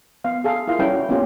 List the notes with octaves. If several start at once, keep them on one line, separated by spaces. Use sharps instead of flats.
B3 F5
G#4 A4 F5
E4 F4 A#4 F5
G3 C#4 E4 A4 B4 G5
F#4
A#3 B3 C#4 D#4 F4 G4